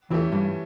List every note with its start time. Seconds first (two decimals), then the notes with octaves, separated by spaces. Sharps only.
0.10 E2 E3 A3 C#4 G4
0.32 G2 E3 G3